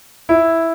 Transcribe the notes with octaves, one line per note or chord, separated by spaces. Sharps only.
E4